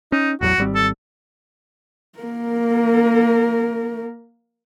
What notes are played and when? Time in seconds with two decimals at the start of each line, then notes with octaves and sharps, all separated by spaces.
0.12 C#4 D#4
0.41 A1 E2 F#3 F#4
0.58 G#1 G3 C4
0.75 A4
2.19 A#3 A#4